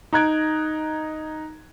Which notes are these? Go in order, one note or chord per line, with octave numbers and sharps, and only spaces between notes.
D#4 A#5 F#6 G#6 D7